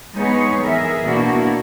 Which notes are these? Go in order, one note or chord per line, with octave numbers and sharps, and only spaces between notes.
G#3 B3 D#4 G#4 B4 C#5
E3 G#4 A#4 E5
B2 A#3 B3 D4 E4 F#4